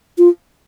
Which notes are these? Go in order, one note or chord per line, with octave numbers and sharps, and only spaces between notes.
F4